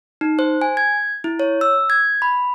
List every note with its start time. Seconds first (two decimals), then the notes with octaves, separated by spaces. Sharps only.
0.21 D#4
0.39 C5
0.61 G#5
0.77 G#6
1.24 E4
1.40 C#5
1.61 E6
1.90 G#6
2.22 B5